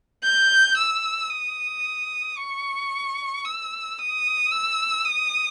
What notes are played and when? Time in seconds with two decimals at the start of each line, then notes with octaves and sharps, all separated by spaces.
0.24 G6
0.77 E6
1.30 D#6
2.38 C#6
3.45 E6
3.99 D#6
4.51 E6
5.05 D#6